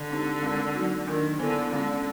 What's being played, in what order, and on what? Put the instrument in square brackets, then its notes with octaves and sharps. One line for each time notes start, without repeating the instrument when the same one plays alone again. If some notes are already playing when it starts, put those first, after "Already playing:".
Already playing: [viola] D3
[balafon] G#3 C4 D#4 G4 C5
G#3 C4 F4 A#4 D5
F#3 A#3 D#4 F#4
[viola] D#3 [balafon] A#3 D4 F4 A#4
[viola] D3 [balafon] B3 E4 A4 C5
[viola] D3 [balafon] G#3 C#4 F4